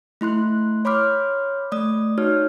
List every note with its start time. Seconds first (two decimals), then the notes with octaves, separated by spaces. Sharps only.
0.21 A3 E4 C6 F#6
0.85 C#5 B5 C6 D6 F6
1.72 A3 D5 D#6
2.18 D#4 F#4 C#5 F6